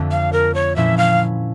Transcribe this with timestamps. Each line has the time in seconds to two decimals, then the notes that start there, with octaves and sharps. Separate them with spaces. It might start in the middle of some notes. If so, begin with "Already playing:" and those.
Already playing: F2 D3 A3
0.11 F5
0.33 A#4
0.55 C#5
0.76 A#2 F3 C#4 E4 E5
0.98 F5